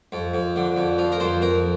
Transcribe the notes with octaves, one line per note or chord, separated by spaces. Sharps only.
F2
F2
D3
F2
F3
A#4
F2 C5
F2 A#4